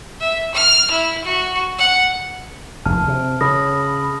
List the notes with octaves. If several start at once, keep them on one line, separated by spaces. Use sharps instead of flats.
E5
F6
E4
F#4
F#5
F1 D#2 A5 F6
C3
C#3 B5 D#6 A#6